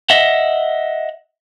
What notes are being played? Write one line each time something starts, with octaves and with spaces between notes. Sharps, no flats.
D#5 E5 F#5